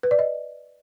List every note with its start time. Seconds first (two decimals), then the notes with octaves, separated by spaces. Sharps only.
0.03 B4
0.11 D5
0.19 D#5